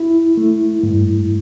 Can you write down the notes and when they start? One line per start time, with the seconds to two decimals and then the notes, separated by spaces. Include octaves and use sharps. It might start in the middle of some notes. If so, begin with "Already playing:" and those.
Already playing: E4
0.37 A3
0.83 G2